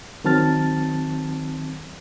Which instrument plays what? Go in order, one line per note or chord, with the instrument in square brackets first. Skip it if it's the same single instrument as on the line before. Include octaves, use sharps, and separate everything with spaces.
[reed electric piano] D#3 F#3 C4 A5 F6 A6